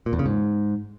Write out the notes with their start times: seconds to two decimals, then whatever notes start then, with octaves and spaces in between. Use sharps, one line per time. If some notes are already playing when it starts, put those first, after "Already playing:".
0.06 A#2
0.13 E2
0.19 C#3
0.26 G#2